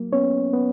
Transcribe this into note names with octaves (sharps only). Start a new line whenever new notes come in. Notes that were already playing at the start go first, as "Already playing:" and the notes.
Already playing: F#3 A#3
B3 C#4 C#5
B3